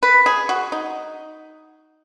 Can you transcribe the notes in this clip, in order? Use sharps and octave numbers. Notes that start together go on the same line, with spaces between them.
B4
G#4
F#4
D#4